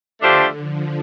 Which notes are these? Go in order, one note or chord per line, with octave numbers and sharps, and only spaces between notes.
D3 F3 A3 D4 G4 C5
F3